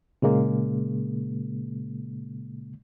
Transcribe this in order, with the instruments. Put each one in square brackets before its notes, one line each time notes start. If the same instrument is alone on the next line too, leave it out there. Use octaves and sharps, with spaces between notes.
[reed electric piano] A#2 C#3 G#3 A#3